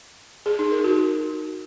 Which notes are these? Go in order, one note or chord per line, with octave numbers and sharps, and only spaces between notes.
G#4
D#4
A#4
F#4